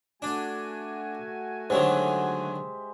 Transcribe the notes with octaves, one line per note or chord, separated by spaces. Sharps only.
A3 D4 F#4 G#5
D3 D#3 F#3 G#3 G4 C5 E5